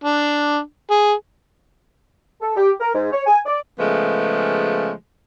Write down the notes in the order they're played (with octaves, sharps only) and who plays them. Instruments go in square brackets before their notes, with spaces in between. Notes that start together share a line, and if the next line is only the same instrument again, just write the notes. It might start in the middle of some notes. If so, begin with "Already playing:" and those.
[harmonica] D4
G#4
[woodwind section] A4
G4
A#4
G#2
C#5
G#5
D5
[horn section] C#3 F3 G#3 A3 B3